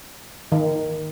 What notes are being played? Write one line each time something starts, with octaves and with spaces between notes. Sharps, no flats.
D#3